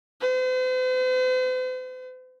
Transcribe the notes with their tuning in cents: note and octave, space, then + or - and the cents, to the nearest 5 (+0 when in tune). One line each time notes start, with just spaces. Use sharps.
C5 -45